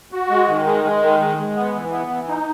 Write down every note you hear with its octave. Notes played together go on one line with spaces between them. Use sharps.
F#4
G#3
D#3
G#3
G#3
D#3
G#3
G#3
B3
E3
B3
E3
D#4